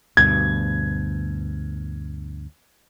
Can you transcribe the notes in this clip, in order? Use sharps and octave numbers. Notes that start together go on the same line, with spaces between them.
D2 G2 B2 G#6